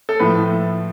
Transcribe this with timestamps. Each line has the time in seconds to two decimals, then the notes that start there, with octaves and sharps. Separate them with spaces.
0.09 A4
0.20 A2 F3 A3 B4